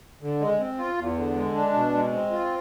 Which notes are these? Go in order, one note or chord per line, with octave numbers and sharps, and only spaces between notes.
D3
G#3
C4
F4
E2
D3
G#3
D4
B2
G#3
C4
F4